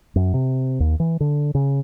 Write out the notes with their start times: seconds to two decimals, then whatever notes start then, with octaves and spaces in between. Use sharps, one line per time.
0.16 F#2
0.34 C3
0.80 D#2
1.00 E3
1.20 D3
1.55 C#3